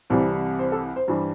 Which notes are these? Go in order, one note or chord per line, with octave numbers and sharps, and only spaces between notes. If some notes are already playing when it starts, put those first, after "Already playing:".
C2 C3 E3 G3 C5
C5
A4
C5
G2 E3 G3 C5